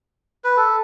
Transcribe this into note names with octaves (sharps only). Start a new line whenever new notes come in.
B4
A4